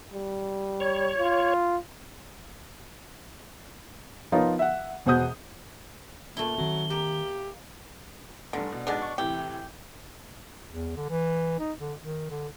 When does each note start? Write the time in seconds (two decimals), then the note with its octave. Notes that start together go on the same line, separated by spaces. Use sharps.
0.13 G3
0.80 C#5
1.18 F4
4.32 F3 B3 D#4 F4 A#4 C#5
4.59 E5 F#5
5.06 E1 B2 C5 F#5 D#6 G6
6.37 A#2 A3 E4 G7
6.58 D#3 F#3 C4
6.90 A#3 G4
8.53 F1 G2 D3
8.72 B2
8.87 G#2 B2 D4 G#4 D5
9.02 C#6
9.18 A2 C3 E3 G4
10.71 E2
10.96 D3
11.09 E3
11.60 D#4
11.80 D3
12.01 D#3
12.30 D3